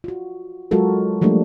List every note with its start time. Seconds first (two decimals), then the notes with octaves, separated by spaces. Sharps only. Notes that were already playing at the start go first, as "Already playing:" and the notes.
0.04 F4 F#4
0.71 F#3 G#3 F4 F#4 A4 A#4
1.22 F3 G3 A3 A#3 D4